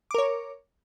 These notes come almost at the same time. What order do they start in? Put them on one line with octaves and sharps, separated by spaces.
D6 A#4 C#5